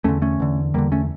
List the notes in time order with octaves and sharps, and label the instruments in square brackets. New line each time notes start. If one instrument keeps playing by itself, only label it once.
[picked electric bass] E2 D3 A3 C#4
A3 C#4
E2 D3
E2 D3 G3 A#3
A3 C#4